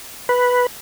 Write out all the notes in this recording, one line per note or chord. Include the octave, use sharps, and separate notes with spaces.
B4